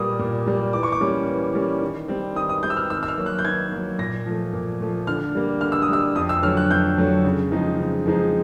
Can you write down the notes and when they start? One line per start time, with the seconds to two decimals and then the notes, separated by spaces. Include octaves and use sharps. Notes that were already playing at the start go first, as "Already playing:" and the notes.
Already playing: A#2 G3 A#3 D#6
0.19 A#2
0.46 G3 A#3
0.73 E3 D6
0.83 C#6
0.92 D6
1.01 G3 A#3 C#4
1.27 E3
1.55 G3 A#3 C#4
1.82 D#3
2.08 G3 C4
2.36 D#3 D#6
2.49 D#6
2.63 G3 C4 G6
2.70 E6
2.77 F6
2.90 D#3 E6
3.03 E6
3.08 F6
3.17 F#3 A#3
3.26 F#6
3.39 G6
3.45 D#3 G#6
3.72 F#3 A#3
3.99 A#2 A#6
4.26 F3 A3
4.53 A#2
4.80 F3 A3
5.07 D3 F6
5.35 G3 A#3
5.61 D3 F6
5.72 E6
5.82 D#6
5.89 G3 A#3 E6
6.15 F2 D#6
6.29 E6
6.42 D3 F#3 A3 F6
6.57 F#6
6.70 F2 G6
6.97 D3 F#3 A3
7.25 C#3
7.51 F3 G#3 C4 D#4
7.78 C#3
8.06 F3 G#3 C4 D#4